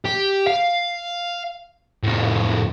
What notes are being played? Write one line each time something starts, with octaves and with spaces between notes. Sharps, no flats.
G4
F5
F2 A2